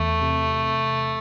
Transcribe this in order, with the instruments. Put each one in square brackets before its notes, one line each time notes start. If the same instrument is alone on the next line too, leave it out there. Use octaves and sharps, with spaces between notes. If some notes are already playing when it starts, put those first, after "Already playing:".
Already playing: [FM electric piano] E2 [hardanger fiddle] A3
[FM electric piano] C3